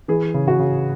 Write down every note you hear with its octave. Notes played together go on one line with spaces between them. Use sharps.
E3 G#4
C#3
F#4
C#3